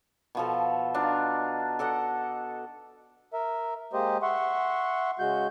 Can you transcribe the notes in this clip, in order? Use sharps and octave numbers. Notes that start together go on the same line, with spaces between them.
B2 F3 A4
D4 D#4 F4
A4 D5 D#5 F#5
A#4 E5
G#3 A#3 G4 C5 D#5
E5 F#5 C6 C#6
C#3 G#3 F#4 G6